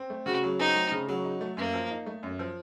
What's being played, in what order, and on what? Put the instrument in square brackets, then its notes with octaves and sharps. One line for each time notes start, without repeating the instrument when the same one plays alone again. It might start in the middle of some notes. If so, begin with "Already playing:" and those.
Already playing: [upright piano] C4
A3
[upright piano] C#3 [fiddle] F#4
[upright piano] F#3
[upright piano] C4 [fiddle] D#4
[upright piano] A3
C#3
F#3
D#4
A3
[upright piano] F#2 [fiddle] A#3
[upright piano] F3
D#4
A3
F#2
F3